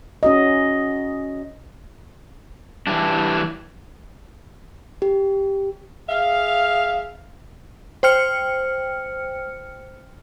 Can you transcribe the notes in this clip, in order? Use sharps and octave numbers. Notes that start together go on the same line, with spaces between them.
C#4 F#4 D#5
E3 G3 D4
G4
G#4 E5 F5
C5 G5 F6 C#7